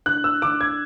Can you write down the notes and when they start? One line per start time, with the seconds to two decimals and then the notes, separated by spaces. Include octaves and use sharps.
0.06 D3 F#6
0.24 E6
0.42 D3 D6
0.61 G#6